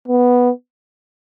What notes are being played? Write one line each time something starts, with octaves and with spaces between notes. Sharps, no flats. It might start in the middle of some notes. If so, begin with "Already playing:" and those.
B3